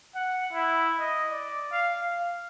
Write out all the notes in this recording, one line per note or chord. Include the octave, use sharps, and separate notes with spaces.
F#5
E4
D#5
D5
F5
F5